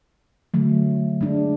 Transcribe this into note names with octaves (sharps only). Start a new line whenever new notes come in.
D3 F#3 A3
G#3 D4